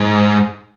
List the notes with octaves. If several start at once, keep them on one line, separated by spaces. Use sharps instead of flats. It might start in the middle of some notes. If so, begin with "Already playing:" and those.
Already playing: G#2